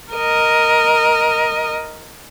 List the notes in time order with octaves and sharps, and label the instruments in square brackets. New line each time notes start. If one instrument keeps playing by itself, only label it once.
[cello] A#4 D#5